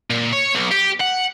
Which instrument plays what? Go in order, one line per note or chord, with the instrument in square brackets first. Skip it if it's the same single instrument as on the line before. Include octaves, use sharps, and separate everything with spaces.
[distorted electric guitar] A#2
C#5
B1
G4
F#5